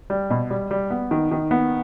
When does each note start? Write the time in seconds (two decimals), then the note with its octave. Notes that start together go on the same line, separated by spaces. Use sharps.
0.10 G3
0.30 B2
0.50 G3
0.71 G3
0.90 B3
1.11 D#3
1.31 D#3
1.51 B3